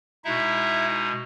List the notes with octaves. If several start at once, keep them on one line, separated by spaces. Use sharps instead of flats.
B2 G#3 D#4 E4 E5